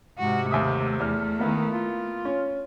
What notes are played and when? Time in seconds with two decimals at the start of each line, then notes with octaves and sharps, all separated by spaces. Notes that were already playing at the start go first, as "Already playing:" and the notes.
0.19 G#2 C3 F#4
0.51 D#2 A3 E5 D#6
1.00 E2 F6
1.39 D#3 A#3 B3 E4
1.71 F4
2.25 C#4